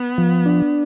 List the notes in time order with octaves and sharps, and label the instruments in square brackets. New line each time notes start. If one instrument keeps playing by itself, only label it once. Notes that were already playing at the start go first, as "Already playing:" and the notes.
Already playing: [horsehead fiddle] B3
[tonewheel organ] F3
D4